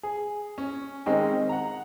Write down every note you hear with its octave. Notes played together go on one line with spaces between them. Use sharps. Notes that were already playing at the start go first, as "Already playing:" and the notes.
G#4
C#4
D#3 G#3 C4 C#4 D#4
F#5 A#5